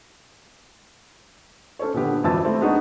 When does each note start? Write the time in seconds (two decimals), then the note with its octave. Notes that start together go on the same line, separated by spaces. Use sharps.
1.79 C#4 A4 C5 C#5
1.94 A#1 D3 B3 G4
2.24 G#1 F2 E3 A5 E6 A6
2.44 A3 C4 B5
2.61 G#3 B3 D4 D#4 F#4 D#5